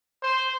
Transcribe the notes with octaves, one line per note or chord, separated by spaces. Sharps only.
C5